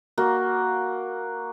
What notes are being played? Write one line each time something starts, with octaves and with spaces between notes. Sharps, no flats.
A#3 F#4